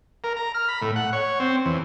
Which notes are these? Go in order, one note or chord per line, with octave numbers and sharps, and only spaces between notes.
A#4
A#5
F6
B5
A2
F#5
C#5
C4
E2